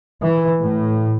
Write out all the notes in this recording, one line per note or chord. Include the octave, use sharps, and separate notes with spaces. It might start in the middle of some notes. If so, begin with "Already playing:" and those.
E3
A2